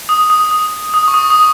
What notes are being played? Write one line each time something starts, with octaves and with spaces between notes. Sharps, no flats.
D#6
D#6
D#6
D#6
C#6
D#6
D#6